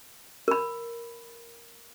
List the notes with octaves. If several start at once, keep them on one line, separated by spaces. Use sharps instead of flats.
A#4 B5